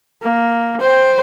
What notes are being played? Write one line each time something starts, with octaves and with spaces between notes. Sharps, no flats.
A#3
C5 G5